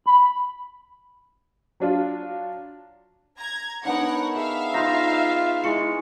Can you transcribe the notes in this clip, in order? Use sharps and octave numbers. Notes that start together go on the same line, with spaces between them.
B5
F#3 D4 F4
A#5 G#6
B3 D4 D#4 A#4 C#5 F#5
G#4 E5 F5
D#4 F4 C#6 A#6
D5
G#3 E4 C#6 C#7